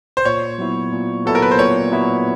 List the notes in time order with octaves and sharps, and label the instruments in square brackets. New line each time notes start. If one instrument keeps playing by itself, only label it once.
[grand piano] C5
[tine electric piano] A#2 [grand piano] C#5
[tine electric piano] F#3 B3 E4
A#2
[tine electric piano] F#3 B3 E4 [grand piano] A4
[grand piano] A#4
B4
C5
[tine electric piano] A#2 [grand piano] C#5
[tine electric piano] F#3 B3 E4